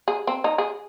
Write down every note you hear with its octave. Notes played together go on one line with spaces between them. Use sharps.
G#4
C4
D#4
G#4